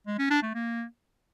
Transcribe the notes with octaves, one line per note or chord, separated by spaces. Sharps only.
G#3
C#4
D4
A3
A#3